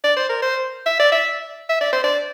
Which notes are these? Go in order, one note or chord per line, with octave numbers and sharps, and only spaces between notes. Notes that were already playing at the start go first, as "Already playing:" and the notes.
D5
C5
A#4
C5
E5
D5
E5
E5
D5
C5
D5